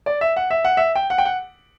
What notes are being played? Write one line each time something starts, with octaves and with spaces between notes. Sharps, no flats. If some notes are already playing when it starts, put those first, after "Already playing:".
D5
E5
F#5
E5
F#5
E5
G5
F#5
G5
F#5